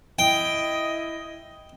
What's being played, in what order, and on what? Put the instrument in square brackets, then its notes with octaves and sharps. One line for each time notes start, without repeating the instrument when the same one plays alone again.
[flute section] E4 D#5 [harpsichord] G5